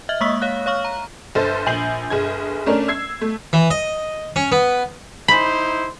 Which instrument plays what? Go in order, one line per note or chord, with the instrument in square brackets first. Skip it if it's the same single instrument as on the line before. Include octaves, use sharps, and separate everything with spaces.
[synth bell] D#5 E5 F6
G#3 A#3 C#6 D#6 E6 B6
C#5 F5 F#6
C#5 F5 C#6 F6
A#5
[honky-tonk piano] G1 A4 C5 A6
A#1 G#5 G6 C7 F#7
G1 G#4 G#6
A3 C#4 D4 A#4
E6 G#6 C7
A3
[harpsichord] E3
D#5
C#4
B3
[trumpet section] D#4 E4 C5 [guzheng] B5